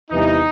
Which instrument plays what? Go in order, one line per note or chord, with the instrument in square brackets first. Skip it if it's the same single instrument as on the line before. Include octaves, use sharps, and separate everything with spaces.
[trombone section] E2 C3 E3 G3 [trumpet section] D#4